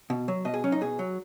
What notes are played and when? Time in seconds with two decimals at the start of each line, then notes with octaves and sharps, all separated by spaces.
0.10 B2
0.28 F#3
0.45 B2 D#5
0.54 G#4
0.64 F#3 C#4
0.72 D#4
0.81 B2 G#4
0.99 F#3